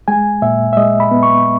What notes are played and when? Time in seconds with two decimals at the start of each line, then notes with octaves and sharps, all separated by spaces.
0.08 G#3 G#5
0.42 A#2 E5
0.73 E5
0.77 G#3 D#5
1.00 B5
1.11 B3
1.23 C#6